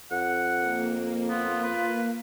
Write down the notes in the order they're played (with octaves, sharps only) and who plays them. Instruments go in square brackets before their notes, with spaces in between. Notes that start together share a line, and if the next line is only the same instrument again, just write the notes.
[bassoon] F2 [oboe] F#5
[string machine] A#3
[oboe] B3 [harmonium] F4
[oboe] B4